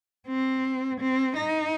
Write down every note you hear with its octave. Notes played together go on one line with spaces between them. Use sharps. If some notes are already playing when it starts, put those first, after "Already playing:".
C4
C4
D#4